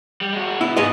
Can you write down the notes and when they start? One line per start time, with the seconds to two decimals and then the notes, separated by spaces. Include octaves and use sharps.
0.21 G3
0.32 G#3 F#4
0.61 B2 B3 E4
0.77 G#2 G#3 B3 D#5